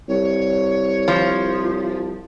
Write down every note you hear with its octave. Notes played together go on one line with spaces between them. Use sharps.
C2 C#5
F3